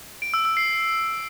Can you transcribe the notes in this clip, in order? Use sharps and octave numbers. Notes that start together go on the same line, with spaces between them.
D7
E6
E6
C7